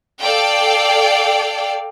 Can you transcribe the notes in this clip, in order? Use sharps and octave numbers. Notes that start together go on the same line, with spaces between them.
A4 D5 F5 G5